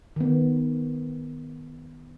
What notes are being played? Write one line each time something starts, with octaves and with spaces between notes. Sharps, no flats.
D#3 B3